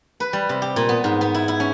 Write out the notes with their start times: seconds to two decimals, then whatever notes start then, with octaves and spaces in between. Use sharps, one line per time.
0.20 B4
0.33 G3
0.49 C3
0.62 G4
0.76 A#2
0.89 B3
1.04 G#2
1.21 B3
1.35 E4
1.48 E4
1.60 C#4